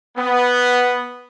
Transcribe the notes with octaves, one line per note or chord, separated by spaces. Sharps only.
B3